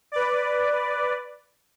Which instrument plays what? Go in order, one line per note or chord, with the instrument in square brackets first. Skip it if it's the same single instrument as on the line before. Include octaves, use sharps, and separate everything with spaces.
[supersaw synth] B4 D5